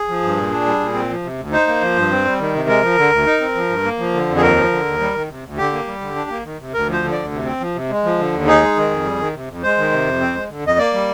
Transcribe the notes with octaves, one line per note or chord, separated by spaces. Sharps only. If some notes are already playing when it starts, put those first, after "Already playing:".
Already playing: G#4
F3
G2
A#2
D4
G3
A#2
C4
F3
C3
D2
D#4 C5
A#3
F3
G2
C4
G3
D#3
C3
G#3 A#4
F3
D3
D2
D#4
C4
F3
G2
A#3
F3
D3
F2
G#4
D#2 A#4
F3
D3
D#2
G3
D#3
C3
D2
D3 G4
A#3
G3
D3
D4
A#3
D#3
C3
D2 A#4
F3 C5
D3
D2 D5
C3
C4
F3
C3
G#3
F3
D3
D#2
D#4 G#4
G#3
D#3
F2
G3
D#3
C3
F2
G#3 C5
D#3
C3
F2
C4
G#3
D3
F2 D#5
A#3 D5
G3